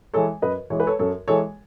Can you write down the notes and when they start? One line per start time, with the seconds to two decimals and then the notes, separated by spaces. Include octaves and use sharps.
0.14 E3 G#3 A4 C#5
0.42 F#2 B4 D#5
0.70 E3 G#3 C#5
0.80 B4
0.87 A4 C#5
0.99 F#2 A4 C#5
1.28 E3 G#3 A4 C#5